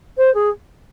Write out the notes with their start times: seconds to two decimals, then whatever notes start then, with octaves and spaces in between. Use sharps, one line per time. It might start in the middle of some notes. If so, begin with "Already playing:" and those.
0.17 C5
0.34 G#4